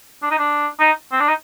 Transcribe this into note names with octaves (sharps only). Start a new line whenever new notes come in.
D4
D#4
D4
D#4
C4
D4
D#4